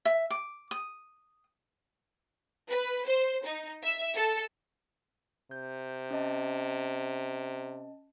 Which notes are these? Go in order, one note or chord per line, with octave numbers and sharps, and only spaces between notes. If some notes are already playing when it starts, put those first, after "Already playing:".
E5
D6
D#6
B4
C5
D#4
E5
A4
C3 G6
C#4 D#5 A5